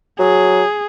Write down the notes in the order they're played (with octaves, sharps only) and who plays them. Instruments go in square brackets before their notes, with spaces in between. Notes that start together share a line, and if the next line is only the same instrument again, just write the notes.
[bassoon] F#3 [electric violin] G#4